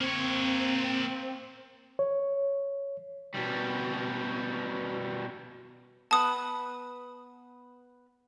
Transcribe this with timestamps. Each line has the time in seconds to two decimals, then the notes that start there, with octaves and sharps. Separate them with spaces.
0.01 A#3 C4 C#5
1.99 C#5
3.34 B2 G3
6.11 B3 B4 A5 D#6